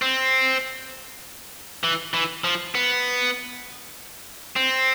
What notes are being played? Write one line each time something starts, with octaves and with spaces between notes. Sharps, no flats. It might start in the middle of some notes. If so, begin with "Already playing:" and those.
C4
E3
E3
F3
B3
C4